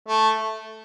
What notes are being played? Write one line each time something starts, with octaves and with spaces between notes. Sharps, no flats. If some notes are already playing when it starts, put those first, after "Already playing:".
A3